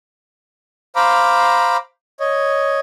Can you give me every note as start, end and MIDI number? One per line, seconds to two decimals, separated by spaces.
0.96 1.77 72
0.96 1.77 77
0.96 1.77 82
0.96 1.77 83
0.96 1.77 86
2.20 2.80 73
2.20 2.80 75